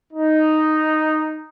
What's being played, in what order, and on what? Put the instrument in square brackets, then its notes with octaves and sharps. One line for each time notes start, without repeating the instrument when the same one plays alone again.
[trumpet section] D#4